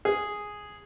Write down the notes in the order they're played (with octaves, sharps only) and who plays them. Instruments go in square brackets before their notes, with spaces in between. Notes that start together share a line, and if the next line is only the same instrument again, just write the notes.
[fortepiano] G#4